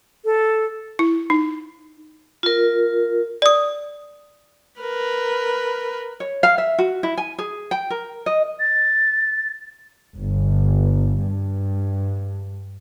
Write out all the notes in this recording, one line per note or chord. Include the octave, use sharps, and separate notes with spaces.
A4
E4
D#4
F4 A#4
D5 D#6
A#4 B4
C#5
F5
E5
F#4
E4
G#5
G#4
G5
A#4
D#5
A6
G1
G2